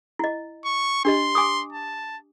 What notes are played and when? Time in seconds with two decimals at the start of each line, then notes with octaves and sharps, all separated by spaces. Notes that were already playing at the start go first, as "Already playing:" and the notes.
0.19 E4 D#5
0.65 C#6
1.05 D4 G4 D#5 C6
1.35 G#5 D6 D#6
1.73 A5